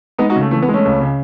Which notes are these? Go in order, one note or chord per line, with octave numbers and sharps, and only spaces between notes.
G#3 B3 D#4
D#4 F#4
C#3
A3
E3 A3
B3
G#3
A3 C#4
C#2
C#3